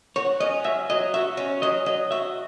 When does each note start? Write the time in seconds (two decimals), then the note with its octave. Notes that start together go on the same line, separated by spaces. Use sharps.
0.16 F#4 C#5
0.40 C#4 D#5
0.64 F#3 E5
0.90 F#3 D#5
1.14 F#4 E5
1.37 C#4
1.62 F#3 D#5
1.86 F#3 D#5
2.11 F#4 E5